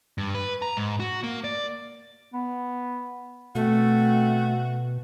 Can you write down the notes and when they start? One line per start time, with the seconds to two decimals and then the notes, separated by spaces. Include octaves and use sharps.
0.18 G2
0.35 B4
0.62 A#5
0.77 G#2
1.00 F#4
1.23 A#3
1.44 D5
2.34 B3
3.55 B2 A3 C4 F#4